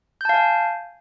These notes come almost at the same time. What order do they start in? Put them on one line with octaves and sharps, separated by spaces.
G6 A5 F5 G#5